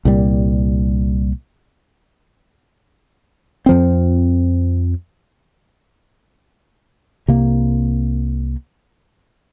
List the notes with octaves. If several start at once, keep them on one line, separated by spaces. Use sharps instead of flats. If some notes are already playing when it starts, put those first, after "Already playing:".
C2 A#2 G3
F2 F3 C4
C2 C3 A#3